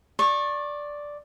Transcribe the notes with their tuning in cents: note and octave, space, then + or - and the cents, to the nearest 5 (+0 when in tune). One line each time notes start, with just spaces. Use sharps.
D5 +0 C#6 -25